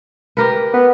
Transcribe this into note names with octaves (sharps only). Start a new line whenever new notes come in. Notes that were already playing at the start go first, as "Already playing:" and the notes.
G4 A#4 B4
B3